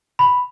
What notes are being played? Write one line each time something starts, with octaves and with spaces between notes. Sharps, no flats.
B5